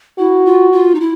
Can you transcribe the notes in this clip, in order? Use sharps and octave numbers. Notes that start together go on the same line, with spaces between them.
E4 F#4
F4
F4
D#4
E4